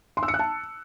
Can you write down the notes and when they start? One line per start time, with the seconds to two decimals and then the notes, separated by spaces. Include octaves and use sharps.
0.17 C6
0.23 E6
0.28 C#7
0.34 F#6
0.39 A5